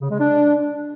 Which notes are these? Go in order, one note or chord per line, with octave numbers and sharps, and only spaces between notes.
C#3
G#3
D4